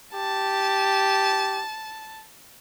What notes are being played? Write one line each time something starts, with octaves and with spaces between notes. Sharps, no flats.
G4 A5